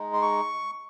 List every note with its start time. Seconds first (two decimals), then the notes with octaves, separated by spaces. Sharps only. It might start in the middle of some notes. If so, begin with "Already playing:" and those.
Already playing: G#3 D#4
0.13 C6
0.22 C#6